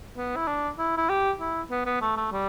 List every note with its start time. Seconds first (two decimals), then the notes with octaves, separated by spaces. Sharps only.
0.17 B3
0.36 E4
0.47 D4
0.78 E4
0.97 E4
1.09 G4
1.40 E4
1.71 B3
1.86 B3
2.01 A3
2.17 A3
2.32 G3